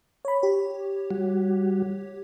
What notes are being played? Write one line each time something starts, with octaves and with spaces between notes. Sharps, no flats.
C#5 B5
G4 C#5
G3 F#4